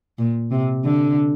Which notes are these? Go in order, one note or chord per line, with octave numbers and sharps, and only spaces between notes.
A#2
C3
D3